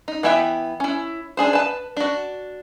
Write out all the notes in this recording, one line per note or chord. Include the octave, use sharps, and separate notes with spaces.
D#4
E3 B3 E4 E5 G5
C#4 E4
D4 G#4 C5
B4 A5
D4 F#4